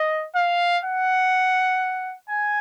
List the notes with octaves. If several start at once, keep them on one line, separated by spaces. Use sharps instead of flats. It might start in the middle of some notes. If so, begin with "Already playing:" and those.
Already playing: D#5
F5
F#5
G#5